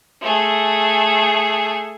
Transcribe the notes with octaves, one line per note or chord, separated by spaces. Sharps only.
A3 G#4